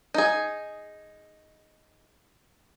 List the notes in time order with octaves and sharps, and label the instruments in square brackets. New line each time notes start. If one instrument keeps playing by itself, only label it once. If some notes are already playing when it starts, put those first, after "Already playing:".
[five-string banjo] D#4 G#4